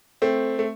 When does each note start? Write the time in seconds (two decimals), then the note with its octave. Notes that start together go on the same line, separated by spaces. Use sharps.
0.22 A3 C4
0.59 A3